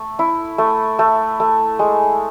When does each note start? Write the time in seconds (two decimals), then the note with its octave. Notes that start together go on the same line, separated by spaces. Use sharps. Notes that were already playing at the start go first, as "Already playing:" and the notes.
Already playing: A3
0.19 E4
0.58 A3
0.99 A3
1.40 A3
1.79 G#3